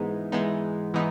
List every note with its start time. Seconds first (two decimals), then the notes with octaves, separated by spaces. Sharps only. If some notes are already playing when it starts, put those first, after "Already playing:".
Already playing: G#2 E3 G#3 B3 D#4
0.32 G#2 E3 G#3 B3 D#4
0.94 E3 G#3 B3 D#4